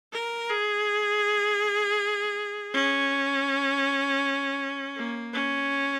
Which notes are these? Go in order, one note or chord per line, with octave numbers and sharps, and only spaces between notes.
A#4
G#4
C#4
A#3
C#4